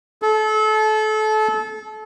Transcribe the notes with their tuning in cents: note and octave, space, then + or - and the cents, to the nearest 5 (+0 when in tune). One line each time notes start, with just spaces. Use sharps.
A4 -30